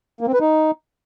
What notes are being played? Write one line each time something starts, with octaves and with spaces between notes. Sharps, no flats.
A#3
C4
B4
D#4